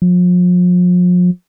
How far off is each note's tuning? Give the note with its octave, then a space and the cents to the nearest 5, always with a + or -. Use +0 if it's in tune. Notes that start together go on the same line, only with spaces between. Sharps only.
F3 +40